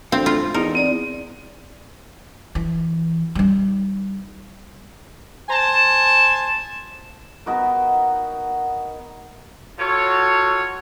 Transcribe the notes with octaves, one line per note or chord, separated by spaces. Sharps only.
D2 C4 C5 F5
A3 F4
G#2
E2 D#4 A#4
C4 D5
E3
G3 D#4
C5 G#5 A5
B3 D#4 F#4 A#4
F4 F#4 A4 C#5